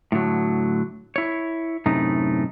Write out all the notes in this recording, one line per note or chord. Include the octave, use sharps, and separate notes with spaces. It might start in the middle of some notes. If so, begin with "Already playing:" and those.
A2 D3 F#3
E4 C#5
F#2 A2 C3 A3 D#4